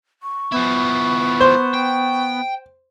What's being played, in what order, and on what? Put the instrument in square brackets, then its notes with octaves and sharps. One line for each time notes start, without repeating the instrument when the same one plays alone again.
[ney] C#6
[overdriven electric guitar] F3 E4 [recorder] B3
[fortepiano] C5
[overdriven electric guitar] G5